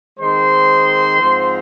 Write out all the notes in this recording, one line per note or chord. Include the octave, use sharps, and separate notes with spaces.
D#3 G#3 C4 D#4 C5 C6
G#2 F3 C4